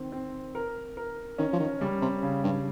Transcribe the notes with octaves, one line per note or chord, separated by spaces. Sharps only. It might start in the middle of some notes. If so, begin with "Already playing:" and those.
Already playing: D#3 C4
C4
A#4
A#4
D#3 C#4
F3
D#3
C#3 G3
C3
C#3
G2